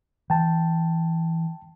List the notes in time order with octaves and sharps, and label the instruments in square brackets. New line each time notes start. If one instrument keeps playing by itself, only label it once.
[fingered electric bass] E3 [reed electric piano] G5 A5